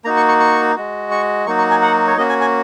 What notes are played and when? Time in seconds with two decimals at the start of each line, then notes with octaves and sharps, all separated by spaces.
0.05 A#3 D#4 F#4 A#5
0.17 C#6
0.29 C#6
0.40 C#6
0.76 G#3 F#4
1.11 C#6
1.46 F#3 A#3 D#4 F#4 C#6
1.58 C#6
1.71 G#5
1.82 F#5
2.07 C#5
2.17 A#3 C#4 F#4 D#5
2.29 G#5
2.41 G#5